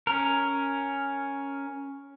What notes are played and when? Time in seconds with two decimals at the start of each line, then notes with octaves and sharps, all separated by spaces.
0.07 C#4 A#4